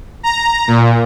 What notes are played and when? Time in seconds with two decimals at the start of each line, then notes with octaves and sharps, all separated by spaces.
0.23 A#5
0.68 A#2